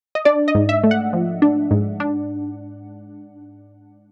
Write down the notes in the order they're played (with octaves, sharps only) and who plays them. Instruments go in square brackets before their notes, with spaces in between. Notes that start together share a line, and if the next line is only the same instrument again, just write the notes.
[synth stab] D#5
D4 D5
D#5
G#2
E5
A3
F#5
F3
D4
G#2
D4